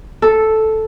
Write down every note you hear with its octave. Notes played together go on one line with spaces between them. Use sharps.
A4